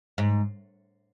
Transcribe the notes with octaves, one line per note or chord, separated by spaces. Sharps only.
G#2